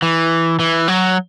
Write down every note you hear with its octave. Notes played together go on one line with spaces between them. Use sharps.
E3
E3
F#3